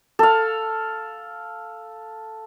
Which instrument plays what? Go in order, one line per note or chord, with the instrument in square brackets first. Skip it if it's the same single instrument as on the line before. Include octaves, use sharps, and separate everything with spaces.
[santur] A4 F5